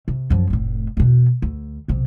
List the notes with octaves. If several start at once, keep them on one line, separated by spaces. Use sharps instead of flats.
C3
F#2 F3
F1 A2
E2 B2
D2
B1 C3